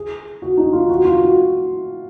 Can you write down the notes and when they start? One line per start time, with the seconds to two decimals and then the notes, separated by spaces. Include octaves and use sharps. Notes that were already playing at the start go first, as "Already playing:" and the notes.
Already playing: G#4
0.42 F#4
0.57 D#4
0.73 F4
0.90 F#4
1.05 F4
1.22 F#4